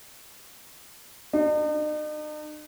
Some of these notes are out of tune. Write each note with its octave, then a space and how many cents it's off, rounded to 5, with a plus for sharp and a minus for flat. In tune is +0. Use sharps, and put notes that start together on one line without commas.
D#4 -45